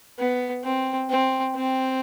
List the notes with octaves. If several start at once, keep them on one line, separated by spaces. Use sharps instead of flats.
B3
C4
C4
C4